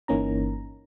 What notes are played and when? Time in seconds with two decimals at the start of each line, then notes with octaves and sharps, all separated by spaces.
0.08 G1 E3 A#3 C#4 D#4 A#5